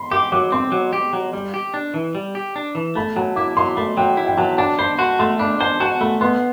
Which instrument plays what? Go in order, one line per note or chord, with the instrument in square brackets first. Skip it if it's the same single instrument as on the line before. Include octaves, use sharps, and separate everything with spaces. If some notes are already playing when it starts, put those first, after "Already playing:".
Already playing: [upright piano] B5 C6
[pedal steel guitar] G4 [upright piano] D6
[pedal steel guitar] F#3 [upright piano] D6
[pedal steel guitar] C4 [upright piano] C6
[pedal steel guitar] F#3
G4
F#3
G3
G4
D4
E3
G3
G4
D4
E3
[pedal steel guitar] A3 [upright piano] B5
[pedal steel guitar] F#3 [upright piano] A5
[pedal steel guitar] E4 [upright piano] D6
[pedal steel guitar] F#3 [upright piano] C6
[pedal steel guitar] A3 [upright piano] B5
[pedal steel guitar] F#3 [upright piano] G5
[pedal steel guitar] E4
[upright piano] G5
[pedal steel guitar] F#3 [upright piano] A5
[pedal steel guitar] D4 [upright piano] A5
[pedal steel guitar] C5 [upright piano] B5
[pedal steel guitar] F#4 [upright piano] C6
[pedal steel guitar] A3 [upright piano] C6
[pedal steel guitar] D4 [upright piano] B5
[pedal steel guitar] C5 [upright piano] A5
[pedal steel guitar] F#4 [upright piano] A5
[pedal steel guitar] A3 [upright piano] B5
[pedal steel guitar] B3 [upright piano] C6